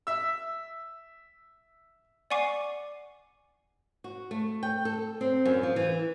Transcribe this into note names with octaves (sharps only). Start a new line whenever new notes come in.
E5 E6
D5 F#5 G#5 C#6 D6 C7
F#4
A3
G5
A4
C4
F#2
F3
E3